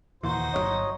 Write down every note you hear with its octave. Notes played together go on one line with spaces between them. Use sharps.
D#2 A#2 E3 D#4 F#4 C5
G1 C#3 F#3 C#5 D#5